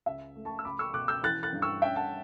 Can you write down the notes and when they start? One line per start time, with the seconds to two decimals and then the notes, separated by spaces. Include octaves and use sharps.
0.06 C#2 E5
0.36 A3
0.45 A5 C#6
0.59 E6
0.65 C#2 B5 D6
0.79 C#6 E6
0.94 B2 D6 F#6
1.08 E6 G6
1.23 E3 F#6 A6
1.43 F#6 A6
1.53 G2
1.62 C#6 E6
1.82 C#4 E5 G5
1.96 F#5 A5